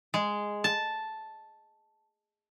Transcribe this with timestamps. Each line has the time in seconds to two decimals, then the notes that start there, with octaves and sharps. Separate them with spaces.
0.14 G#3
0.64 A5